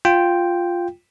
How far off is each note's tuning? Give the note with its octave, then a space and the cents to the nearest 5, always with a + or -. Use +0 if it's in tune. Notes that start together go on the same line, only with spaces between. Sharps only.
F4 +0 G5 +0